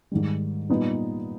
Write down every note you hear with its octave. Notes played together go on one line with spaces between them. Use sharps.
G#2 D#3 G3
A#2 G3 B3 D#4